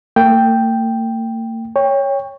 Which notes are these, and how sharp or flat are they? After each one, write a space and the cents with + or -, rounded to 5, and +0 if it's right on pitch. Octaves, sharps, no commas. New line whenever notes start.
A#3 -45 G5 +0
C#5 +0 G5 +25